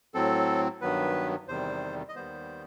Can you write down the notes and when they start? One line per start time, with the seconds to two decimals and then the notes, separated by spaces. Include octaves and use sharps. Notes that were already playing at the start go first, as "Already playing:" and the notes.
0.14 A2 F#3 C4 A4
0.81 G2 D#3 F#3 B3 B4
1.48 E2 C3 D#3 G3 C5
2.09 D#5
2.15 D#2 D#3 G3 B3 C5